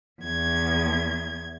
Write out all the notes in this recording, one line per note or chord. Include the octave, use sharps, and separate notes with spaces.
E2 G#6